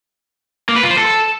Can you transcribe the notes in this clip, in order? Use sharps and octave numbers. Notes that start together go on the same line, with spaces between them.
A#3
B4
F4
C5
A4